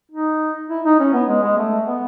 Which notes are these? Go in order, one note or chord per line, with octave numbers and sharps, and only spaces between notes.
D#4
E4
D#4
C#4
B3
G#3
G#3
A3
B3